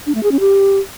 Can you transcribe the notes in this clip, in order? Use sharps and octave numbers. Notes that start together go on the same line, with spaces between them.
D4
A3
G#4
C#4
G4